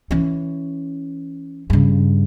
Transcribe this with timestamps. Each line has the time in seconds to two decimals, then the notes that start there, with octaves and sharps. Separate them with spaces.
0.11 E3 C#4
1.70 G2 C#3